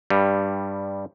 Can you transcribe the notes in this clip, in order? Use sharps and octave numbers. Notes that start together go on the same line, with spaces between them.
G2 G3